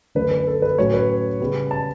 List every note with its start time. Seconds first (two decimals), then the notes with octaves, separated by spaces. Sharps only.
0.15 F#2 D3 A3 D4 B4
0.31 B4
0.47 A4
0.62 B4
0.78 A2 F#3 C#4 C#5
0.94 B4
1.40 C#3 G3 B3
1.71 A5